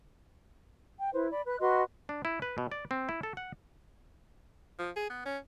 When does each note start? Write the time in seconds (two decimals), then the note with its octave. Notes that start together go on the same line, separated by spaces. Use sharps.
0.99 G5
1.13 E4 B4 C5
1.31 D5 B5
1.46 B4 F#6
1.60 F#4 B4 D#5 C6
2.09 D4
2.25 E4
2.42 B4
2.58 B2
2.72 D5
2.91 C4
3.09 E4
3.23 A4
3.37 F#5
4.79 F3
4.96 G#4
5.10 B3
5.25 C#4